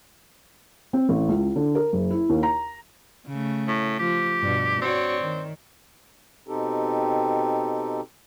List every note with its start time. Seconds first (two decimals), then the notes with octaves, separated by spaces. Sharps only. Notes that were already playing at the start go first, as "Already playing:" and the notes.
0.93 C4
1.09 A1
1.29 C#2
1.56 D3
1.75 A#4
1.93 F#1
2.10 E4
2.30 D#2
2.43 A#5
3.27 C#3 A3
3.68 A2
3.99 F3 G4
4.42 G2 B2
4.82 C4 F#4 C#5 D5
5.22 D#3
6.48 B2 C4 D#4 G4 A4